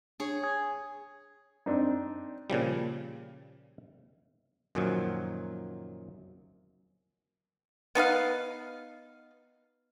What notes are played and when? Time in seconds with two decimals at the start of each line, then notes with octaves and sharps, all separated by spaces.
0.20 D4 G#4 C#5
0.43 G#5 D#6 G#6
1.66 C4 D4 D#4
2.50 A#2 C#3 F3 G3
4.75 F#2 A#2 D#3 F3 F#3
7.95 B3 D#4 B4 F5